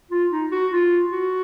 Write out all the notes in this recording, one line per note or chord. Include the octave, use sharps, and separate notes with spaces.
F4
D#4
F#4
F4
F#4